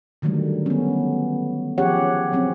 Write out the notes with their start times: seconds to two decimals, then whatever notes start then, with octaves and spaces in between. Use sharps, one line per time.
0.22 D3 D#3 F#3 G3 A3
0.66 B3 C#4
1.78 F3 C#4 G4 G#4 C#5 F#5
2.32 F3 F#3 C4 C#4